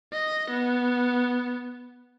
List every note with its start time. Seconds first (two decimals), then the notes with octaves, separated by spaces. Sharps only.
0.12 D#5
0.51 B3